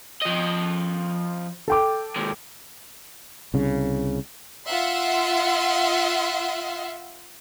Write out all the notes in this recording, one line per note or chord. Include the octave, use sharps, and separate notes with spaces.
F3 D#5
A4 G5 D6
D#2 G#3
C2 C#3
F4 E5 F#5 C6